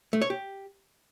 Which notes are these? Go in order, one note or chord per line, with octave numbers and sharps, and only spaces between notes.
A3
C#5
G4